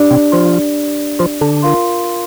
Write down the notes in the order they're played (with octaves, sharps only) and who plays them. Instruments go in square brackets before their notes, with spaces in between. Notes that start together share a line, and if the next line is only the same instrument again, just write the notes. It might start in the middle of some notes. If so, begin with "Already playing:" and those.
Already playing: [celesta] D4 G4 D5
[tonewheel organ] C3 C4
F3 F4
F3 F4
D3 D4
[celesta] F4 A#4 F5 C6